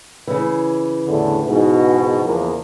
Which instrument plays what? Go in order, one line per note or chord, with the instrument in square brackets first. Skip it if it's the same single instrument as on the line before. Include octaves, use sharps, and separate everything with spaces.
[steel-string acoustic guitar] C#3 E3
[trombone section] E2 A2 D3
G#2 B2
E2 F3 A#3